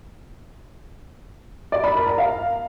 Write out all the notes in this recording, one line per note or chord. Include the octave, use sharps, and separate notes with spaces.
D5
B5
A#4
A#5
F5